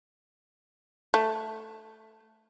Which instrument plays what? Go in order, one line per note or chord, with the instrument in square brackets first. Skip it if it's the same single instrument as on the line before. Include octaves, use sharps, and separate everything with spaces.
[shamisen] A3